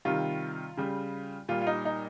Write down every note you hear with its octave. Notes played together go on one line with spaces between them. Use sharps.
C3 D#3 G3 F4
C#3 G3
A#2 G3 F4
F4
D#4
D#4